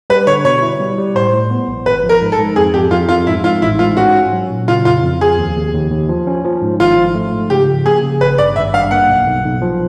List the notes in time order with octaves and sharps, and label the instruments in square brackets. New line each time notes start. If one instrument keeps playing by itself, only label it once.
[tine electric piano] G3 [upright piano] B4
[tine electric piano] D3 [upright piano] C#5
[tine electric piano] B2 [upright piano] C#5
[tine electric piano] E4
G3
G3
[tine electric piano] A2 [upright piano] C5
[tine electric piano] A2
B3
A#1
[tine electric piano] G#1 [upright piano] B4
[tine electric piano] F3
[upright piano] A#4
[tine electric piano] G#2
[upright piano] A4
[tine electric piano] G#2
[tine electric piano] F2 [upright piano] G#4
[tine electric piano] F2 [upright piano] G4
[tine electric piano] F2 [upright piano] F4
[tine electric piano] F2 [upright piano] F4
[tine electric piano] G#2 [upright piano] E4
[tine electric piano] G#2 [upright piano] F4
[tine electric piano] A1 [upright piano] E4
[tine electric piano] G#2 [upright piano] F4
[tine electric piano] C#4 [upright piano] F#4
[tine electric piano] C#4
F#3
A#2
[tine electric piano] C#3 [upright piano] F4
[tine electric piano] F2 [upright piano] F4
[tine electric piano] F2
[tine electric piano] F3 [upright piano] G#4
[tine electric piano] D#2
D#2
D#2
D#2
F3
C#4
F3
G#2
[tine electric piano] G#1 [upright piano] F4
[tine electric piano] F3
A3
G#2
[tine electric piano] C#3 [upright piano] G4
[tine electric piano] F3
[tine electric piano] A#3 [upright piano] G#4
[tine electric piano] C#3
[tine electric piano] G#1 [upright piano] B4
[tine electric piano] G2 [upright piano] D5
[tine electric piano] G#1 [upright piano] E5
[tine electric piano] G2 [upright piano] F5
[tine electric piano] A#3 [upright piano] F#5
[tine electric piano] B1
B1
B1
F3